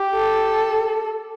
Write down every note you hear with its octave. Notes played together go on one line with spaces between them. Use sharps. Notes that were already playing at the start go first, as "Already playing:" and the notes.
Already playing: G4
A4